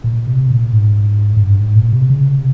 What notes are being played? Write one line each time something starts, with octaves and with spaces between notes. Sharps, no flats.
A#2
C3
A#2
G#2
G#2
G2
G#2
A#2
C3
C#3
C3